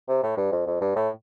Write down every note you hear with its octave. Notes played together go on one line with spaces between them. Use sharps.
C3
A2
G2
F2
F2
G2
A2